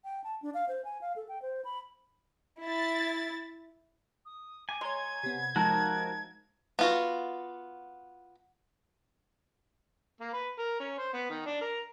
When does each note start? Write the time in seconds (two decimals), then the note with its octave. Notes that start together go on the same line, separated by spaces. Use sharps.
0.04 G5
0.24 A5
0.42 D4
0.54 F5
0.69 C5
0.85 G#5
1.01 F5
1.16 A4
1.29 G5
1.42 C5
1.65 B5
2.63 E4 A6
4.25 D#6
4.69 G#5 D6
4.81 G#3 C#5 A#5 C6 G#6
5.23 C3 B3
5.56 F3 G#3 D#4 F#4 A4 A#4
6.79 B3 F4 F#4
10.21 A#3
10.33 B4
10.59 A#4
10.80 C#4
10.98 C5
11.13 B3
11.30 D#3
11.46 D4
11.61 A#4